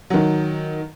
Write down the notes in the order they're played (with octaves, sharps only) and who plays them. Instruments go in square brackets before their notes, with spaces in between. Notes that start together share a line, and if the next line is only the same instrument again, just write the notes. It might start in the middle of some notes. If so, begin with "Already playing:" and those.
[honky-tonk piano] D#3 F#3